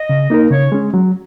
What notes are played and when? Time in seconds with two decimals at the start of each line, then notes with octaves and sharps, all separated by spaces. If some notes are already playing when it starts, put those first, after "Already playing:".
Already playing: D#5
0.09 C#3
0.30 A#3 D#4 A#4
0.51 C#3 C#5
0.72 G#3 C#4
0.94 F#3